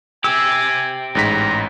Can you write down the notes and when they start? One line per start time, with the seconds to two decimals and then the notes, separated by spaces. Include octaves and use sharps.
0.24 C4 G4 G#5 E6
1.15 A1 G#2 A#5 B6